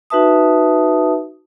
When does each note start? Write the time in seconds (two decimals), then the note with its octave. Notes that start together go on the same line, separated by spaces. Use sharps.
0.10 D#4 F#4 B4 E5 A5 D#6